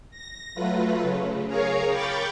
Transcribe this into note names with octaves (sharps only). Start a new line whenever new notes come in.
A#6
F#3 A3 F4 B4
C#3
G#4 A#4 C#5 F5 A#5
G5 B5 C#6 D6 G6 A6